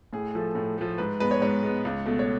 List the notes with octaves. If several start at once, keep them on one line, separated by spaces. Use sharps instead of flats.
A2 G#4
F3 A3 A4
A2
F3 A3
G#2 B4
G#3 B3 B4
C#5
G#2 C#5
G#3 B3
C#2
B2 A3
C#5